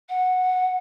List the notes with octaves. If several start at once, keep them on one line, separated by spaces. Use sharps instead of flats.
F#5